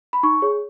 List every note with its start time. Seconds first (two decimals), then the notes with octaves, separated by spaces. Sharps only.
0.13 B5
0.23 D#4 C#6
0.42 G#4 C#5